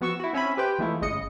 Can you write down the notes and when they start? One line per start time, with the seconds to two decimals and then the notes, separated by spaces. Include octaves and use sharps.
0.01 F3 B3 F#4 C#6 E6
0.20 E4 F#4
0.33 C4 C#4 E5 G#5 B5
0.57 G4 B4 C5 G5
0.79 E3 G#3 A3 E4 F4
1.01 G1 C#3 G#3 D#5 C#7